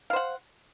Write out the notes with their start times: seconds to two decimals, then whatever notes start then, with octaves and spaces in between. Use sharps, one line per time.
0.10 F5
0.13 C5
0.16 F#5